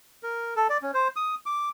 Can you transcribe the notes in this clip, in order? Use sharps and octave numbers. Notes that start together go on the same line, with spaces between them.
A#4
A4
D5
C#4
C5
D#6
D6